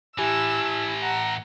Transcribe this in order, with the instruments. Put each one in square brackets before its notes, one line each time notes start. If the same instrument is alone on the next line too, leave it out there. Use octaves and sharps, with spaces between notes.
[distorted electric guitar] A2 E3 [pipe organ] E4 [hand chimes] G4 G#5 F#6 [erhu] E6
[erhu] F#5 [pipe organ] A#5